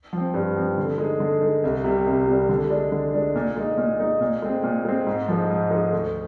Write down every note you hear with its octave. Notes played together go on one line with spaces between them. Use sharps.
F3 C4
G2
F3 C4
D3
G#3 D#4
D3
G#3 D#4
C2
C3 G3
C2
C3 G3
D3
G#3 D4
D3
G#3 D4
A#2
G#3 D#4
A#2
G#3 D#4
A#2
G#3 C4
A#2
G#3 C4
G#2
F3 G#3 D#4
G#2
F3 G#3 D#4
D2